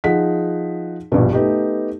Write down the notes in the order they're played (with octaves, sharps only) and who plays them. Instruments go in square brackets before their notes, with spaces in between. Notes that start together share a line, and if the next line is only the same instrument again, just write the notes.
[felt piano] F3 D#4 G#4 F#5 B6
A#1 G2 B2
A3 B3 D#4 G4